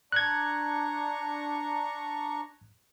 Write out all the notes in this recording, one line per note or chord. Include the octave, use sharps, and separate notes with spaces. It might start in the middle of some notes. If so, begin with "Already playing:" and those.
D4 A#5 C#6 F#6 G#6